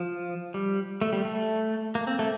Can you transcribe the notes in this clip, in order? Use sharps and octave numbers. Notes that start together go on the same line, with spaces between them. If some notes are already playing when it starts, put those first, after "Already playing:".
Already playing: F3
G3
A3
G3
A3
A#3
C4
A3